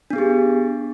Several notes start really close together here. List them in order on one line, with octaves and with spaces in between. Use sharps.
D4 B3 G#4 G4